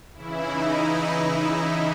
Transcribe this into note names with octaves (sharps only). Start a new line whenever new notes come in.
C#3 E3 E4
D#4
D#4